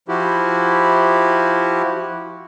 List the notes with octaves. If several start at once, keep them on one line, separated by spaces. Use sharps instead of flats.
F3 E4 F#4 G4